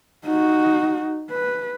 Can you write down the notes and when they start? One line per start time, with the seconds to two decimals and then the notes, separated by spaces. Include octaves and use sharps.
0.25 D#4 F#4
1.31 B4